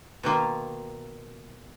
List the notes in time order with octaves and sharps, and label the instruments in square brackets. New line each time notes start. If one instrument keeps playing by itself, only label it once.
[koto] B2 D#3 A#3 F4